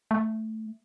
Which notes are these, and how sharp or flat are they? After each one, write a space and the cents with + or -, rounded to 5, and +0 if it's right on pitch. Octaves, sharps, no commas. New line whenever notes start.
A3 +0